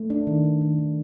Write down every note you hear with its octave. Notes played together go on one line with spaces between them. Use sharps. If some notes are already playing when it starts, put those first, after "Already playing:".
Already playing: A3
D4
D#3
D#3
D#3
D#3